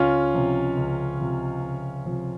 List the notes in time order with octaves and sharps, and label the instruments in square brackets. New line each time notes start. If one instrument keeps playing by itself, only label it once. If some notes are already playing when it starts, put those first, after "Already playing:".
Already playing: [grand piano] C#2 C#4 F4
C3 F3
C#2
C3 F3
C#2
C3 F3